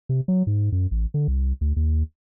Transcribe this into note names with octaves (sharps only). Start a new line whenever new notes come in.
C3
F#3
G#2
F#2
A1
D3
C2
D2
D#2